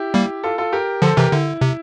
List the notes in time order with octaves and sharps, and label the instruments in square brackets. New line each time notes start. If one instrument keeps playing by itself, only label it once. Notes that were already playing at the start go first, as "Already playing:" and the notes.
Already playing: [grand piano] E4 G4
[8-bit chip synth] G3 A#3
[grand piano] F4 A4
F4 A4
G4 A#4
[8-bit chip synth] D3 F3 [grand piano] A4 C5
[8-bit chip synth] C3 E3 [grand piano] G4 A#4
[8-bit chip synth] D3 [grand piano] E4
[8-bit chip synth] C3